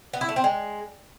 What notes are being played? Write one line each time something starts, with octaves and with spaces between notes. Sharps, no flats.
B3
E4
A3
C4
G#3